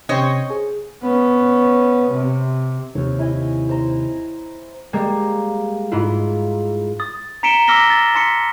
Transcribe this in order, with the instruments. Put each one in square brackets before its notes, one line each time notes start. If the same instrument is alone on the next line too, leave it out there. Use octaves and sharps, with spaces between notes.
[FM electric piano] C3 C#4 G5 [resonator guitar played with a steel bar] C5 C#5 D#5
[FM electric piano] G#4
[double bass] B3 C#4
C3
[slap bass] D#2 C3 [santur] C#5
[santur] E4 D#5 G#5
C5 A#5
[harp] G3 G#3 A#3
G#2 E4 F4
[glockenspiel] D#6 A6
A#5 B6 C#7 D7 E7 G7
D6 E6 F6 A#6 B6 G7
A6 E7
A5 C6 B6 C#7